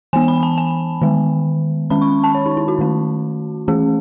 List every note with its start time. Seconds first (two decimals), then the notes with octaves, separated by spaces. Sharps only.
0.13 E3 B3 G#5
0.28 B5
0.43 A5
0.58 G#5
1.02 D#3 G#3 B3
1.90 D#3 G#3 C#4 B5
2.02 C#6
2.24 A5
2.35 C#5
2.46 D#4
2.57 E4
2.68 F#4
2.79 D#3 A3 C#4
3.68 E3 A3 C#4 G#4